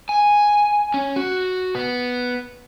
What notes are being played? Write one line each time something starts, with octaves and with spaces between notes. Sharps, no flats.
G#5
C#4
F#4
B3